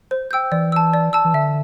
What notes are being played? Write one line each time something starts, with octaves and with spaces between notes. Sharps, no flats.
C5
G5 E6 G6
E3 D5
A5 E6
D5
A5 E6
E3
D3 E5